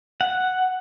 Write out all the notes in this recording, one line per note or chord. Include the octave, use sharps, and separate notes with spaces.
F#5